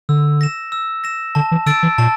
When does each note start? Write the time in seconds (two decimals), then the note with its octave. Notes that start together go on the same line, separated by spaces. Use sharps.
0.09 D3 E6
0.41 A#6 E7
0.72 E6
1.04 A#6 E7
1.35 D3 A5
1.51 E3
1.66 D3 E6 A6 D7
1.83 E3
1.98 A#2 A5